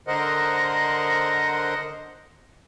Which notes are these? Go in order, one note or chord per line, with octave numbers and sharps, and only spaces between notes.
D3 A#4 C5 D#5 F#5